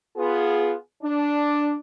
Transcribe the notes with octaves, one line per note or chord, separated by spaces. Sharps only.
B3 F4 G#4
D4